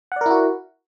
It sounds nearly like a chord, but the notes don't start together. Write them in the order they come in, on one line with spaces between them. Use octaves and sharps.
F#5 D5 A#4 E4 F#4